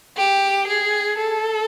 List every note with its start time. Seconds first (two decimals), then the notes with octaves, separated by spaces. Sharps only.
0.17 G4
0.67 G#4
1.18 A4